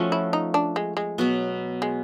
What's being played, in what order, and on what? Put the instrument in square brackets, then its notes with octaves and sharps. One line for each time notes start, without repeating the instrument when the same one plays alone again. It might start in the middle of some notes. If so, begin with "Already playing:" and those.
Already playing: [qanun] F3 A3 C#4 F#4
[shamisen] E4
D#4
D4
G#3
G#3
[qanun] B2 F#3 B3
[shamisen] G#3